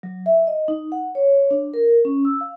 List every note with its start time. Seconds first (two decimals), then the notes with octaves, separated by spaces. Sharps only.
0.03 F#3
0.26 E5
0.47 D#5
0.68 D#4
0.92 F#5
1.15 C#5
1.51 D4
1.74 A#4
2.05 C#4
2.25 E6
2.41 F5